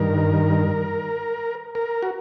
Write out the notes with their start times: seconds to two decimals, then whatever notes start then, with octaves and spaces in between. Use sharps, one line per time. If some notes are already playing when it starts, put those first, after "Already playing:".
Already playing: G2 D#3 A#4
1.75 A#4
2.03 F#4